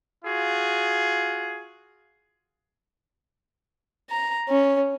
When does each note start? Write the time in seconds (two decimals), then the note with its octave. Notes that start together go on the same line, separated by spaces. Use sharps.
0.25 F4 F#4 G#4
4.10 A#5
4.48 C#4